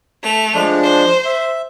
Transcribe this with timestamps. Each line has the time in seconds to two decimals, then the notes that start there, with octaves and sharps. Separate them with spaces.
0.23 A3 F7
0.54 F3 G#3 D4
0.83 C5
1.25 E5